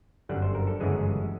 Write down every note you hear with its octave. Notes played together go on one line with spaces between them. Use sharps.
G1 F#2 D3 G3 F#5
C5
A#4
A4
G1 F#2 C#3 E3 G#3 G#4